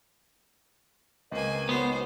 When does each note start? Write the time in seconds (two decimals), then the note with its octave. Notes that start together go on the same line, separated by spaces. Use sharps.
1.32 C#2 A#3 C4 B4 D#5 G#5
1.69 G#2 C#3 F#3 B3 C5